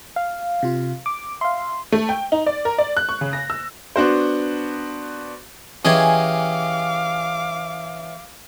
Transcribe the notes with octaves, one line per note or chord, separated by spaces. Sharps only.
F5
C3 F4
D6
E5 F5 C6
A3
G5
D#4
D5
A#4
D5
F#6
C#6
C#3
A#6
E6
B3 D4 F#4 C5
E3 C#4 G4 G#4 D#5 F5 G#5 D6